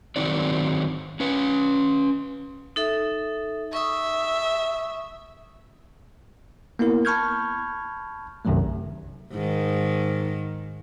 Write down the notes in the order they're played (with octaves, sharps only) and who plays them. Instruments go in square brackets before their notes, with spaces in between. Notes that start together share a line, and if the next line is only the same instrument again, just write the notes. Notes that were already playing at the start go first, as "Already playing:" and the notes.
[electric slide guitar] D#3 F#3 C4 D#4 D5
C#4 B4
[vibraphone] D#4 A4 E5
[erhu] E5 [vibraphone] C#6 D#6
[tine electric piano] A#3 B3 E4 A#4
A5 B5 C#6 F6 G6 G#6
B1 F#2 C3 D#3 F#3 A3
[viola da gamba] G#2 D#3